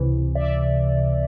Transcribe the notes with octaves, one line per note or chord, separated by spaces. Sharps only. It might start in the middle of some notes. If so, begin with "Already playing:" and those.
Already playing: C#2 C3 E3
D5 E5